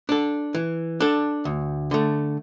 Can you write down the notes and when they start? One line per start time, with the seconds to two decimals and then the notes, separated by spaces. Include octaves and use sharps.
0.09 D4 A4
0.55 E3
1.00 D4 A4
1.45 D2
1.91 D3 A3